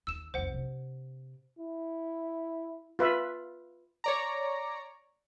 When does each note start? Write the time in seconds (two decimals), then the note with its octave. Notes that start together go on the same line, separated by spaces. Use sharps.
0.07 D#2 D#3 E6 E7
0.34 C2 F2 C5 F#5
0.54 C3 D4
1.59 E4
2.99 F4 B4 E5
4.04 C#5 D5 A#5